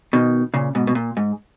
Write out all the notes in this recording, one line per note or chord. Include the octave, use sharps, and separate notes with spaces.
B2 D#3
A#2 C#3
G#2 B2
B2
A#2
G#2